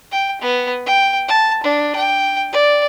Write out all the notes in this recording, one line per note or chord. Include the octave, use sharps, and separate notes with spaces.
G5
B3
G5
A5
D4
G5
D5